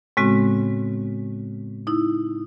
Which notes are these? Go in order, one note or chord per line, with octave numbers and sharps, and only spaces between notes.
A2 C#3 G#3 B3 C4 F#4
D#4 E4